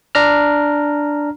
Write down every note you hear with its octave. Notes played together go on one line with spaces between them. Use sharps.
D4 A#5 F6